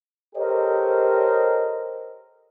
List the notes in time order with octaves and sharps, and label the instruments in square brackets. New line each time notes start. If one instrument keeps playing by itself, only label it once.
[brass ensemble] G4 A4 A#4 C5 C#5 D#5